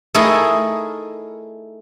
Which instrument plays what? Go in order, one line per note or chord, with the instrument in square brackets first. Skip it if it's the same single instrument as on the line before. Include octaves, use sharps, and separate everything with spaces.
[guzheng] A3 D#4 E4 G#4 A#4